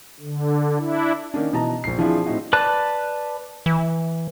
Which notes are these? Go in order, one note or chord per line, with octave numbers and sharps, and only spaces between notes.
D3
D4 E4
D#3 A#3 C#4 D4
B2 E3 D#5 A5 A#5
A#1 C7
E3 F3 C4 D4 E4 G#4
A2 C4 D#4 E4 F#4
B4 D5 A5 F#6
E3